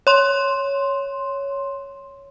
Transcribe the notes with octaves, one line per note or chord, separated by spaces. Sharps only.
C#5 C6